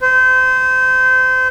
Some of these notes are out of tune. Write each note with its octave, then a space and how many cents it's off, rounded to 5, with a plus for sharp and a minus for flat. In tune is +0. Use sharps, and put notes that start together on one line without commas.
C5 -25